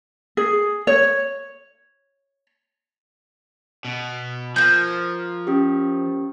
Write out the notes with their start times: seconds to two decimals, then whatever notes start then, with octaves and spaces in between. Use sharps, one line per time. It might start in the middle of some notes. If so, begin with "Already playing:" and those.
0.37 G#4
0.87 C#5
3.85 B2
4.56 F3 A#3 G6
5.47 C#4 G4